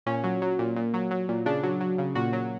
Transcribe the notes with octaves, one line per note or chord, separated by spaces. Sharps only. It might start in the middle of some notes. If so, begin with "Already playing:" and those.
A#2 C#4
F#3
F#3
A#2
A#2
F#3
F#3
A#2
C#3 D4
F#3
F#3
C#3
A#2 F#4
F#3